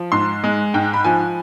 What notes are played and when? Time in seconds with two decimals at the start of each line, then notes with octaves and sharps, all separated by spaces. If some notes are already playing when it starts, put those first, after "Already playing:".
Already playing: F3
0.12 G#2 C6
0.44 G#3
0.74 G#2 G5
0.93 B5
1.05 F3 G#5